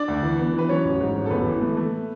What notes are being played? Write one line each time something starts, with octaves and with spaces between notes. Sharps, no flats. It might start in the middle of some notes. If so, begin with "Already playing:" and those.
Already playing: D4 D5
D2
E3
B3
E3 B4
F#3 C#4 C#5
A1
G#2
F#3
A4
A1 B3 B4
E3
A3
A3